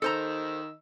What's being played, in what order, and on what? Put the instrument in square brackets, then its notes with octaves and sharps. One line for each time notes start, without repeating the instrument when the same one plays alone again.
[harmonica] D#3 D#5 E6 [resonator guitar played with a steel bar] A4 C5 A#5